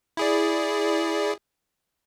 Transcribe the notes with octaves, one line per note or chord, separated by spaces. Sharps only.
E4 G#4 D5